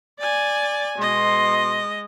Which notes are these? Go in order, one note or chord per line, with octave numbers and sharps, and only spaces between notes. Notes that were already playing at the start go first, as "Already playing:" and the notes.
D5 G#5
B2 G#3 D#5 C6